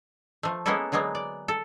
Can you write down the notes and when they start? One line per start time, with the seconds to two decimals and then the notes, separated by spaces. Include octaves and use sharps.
0.43 F3 A3
0.66 G#3 A#3 B3 C#4 E4 A4
0.92 D3 F#3 G#3 A#3 B3
1.15 D5
1.48 A4